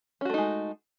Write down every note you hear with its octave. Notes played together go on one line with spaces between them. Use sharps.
G#3 A3 C#4 D#4 F#4